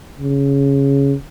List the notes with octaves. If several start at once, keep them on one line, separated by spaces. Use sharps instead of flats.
C#3